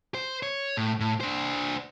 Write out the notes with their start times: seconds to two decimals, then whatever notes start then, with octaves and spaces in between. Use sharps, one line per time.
0.15 C5
0.43 C#5
0.77 A2
1.00 A2
1.20 D4 C5